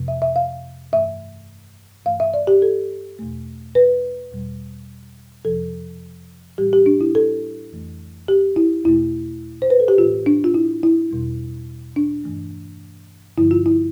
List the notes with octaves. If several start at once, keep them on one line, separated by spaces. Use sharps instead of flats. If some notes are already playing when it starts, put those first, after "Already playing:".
Already playing: F2 C3 F3 A3
E5
E5
F5
G2 E3 A3 E5
G2 E3 A3 F5
E5
D5
G4
A4
E2 B2 A3
B4
E2 B2 G3
F2 C3 F3 A4
A2 E3 G3 G4
G4
D4
E4
A4
F2 E3 A3
G4
E4
E2 B2 A3 E4
C5
B4
A4
G4
A2 E3 A3 F4
D4
F4
E4
E4
E2 B2 G3
D4
G2 E3 A3
G2 D3 F3 A3 E4
F4
E4